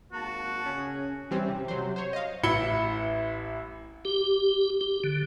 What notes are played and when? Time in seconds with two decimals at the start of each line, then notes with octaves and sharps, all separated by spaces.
0.12 G#1 A#3 F#4 A5
0.66 C#3 C#4 G#4
1.31 E3 G3 C4 C#4
1.48 C3
1.68 C3 F#3 C5
1.96 C5 C#5
2.13 D#5 F5
2.43 A1 E4 E5 B5 C#7 G7
4.05 G4
4.81 G4
5.04 D3